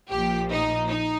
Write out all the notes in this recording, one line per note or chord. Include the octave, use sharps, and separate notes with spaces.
A#1 A#2 F3 G4
D#4
D#4